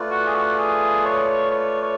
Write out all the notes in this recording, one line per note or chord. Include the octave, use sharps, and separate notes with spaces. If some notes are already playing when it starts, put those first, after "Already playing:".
Already playing: A3 F4 B4 D5
F#4
G#4
F#4
G#4
C#5
C#5
C#5